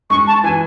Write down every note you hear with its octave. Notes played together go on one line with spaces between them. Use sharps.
G#3 C#6
A5
E3 G#5